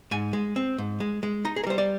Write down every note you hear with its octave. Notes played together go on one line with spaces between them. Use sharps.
G#2 G#5
G#3
C4
G#2
G#3
G#3
D#4 A#5
G#4
A#4
G3 C5
D5